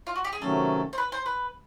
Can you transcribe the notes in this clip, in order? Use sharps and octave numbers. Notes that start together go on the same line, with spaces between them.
F4
F#4
G4
G#4
C3 D#3 F#3 A3 C#4 A4
C5
B4
C5
B4